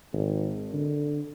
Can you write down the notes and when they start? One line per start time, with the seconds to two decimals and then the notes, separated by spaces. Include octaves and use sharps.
0.13 G#1
0.73 D3